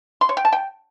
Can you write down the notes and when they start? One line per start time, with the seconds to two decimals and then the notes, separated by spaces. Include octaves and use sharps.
0.21 C6
0.29 C#5
0.37 G5
0.45 A5
0.53 G5